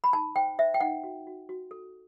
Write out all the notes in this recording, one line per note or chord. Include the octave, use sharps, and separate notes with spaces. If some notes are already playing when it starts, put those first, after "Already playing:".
B5
D#4 A5
C5 G5
C5 E5
G5
D#4 F#5
F#4
F#4
F#4
A4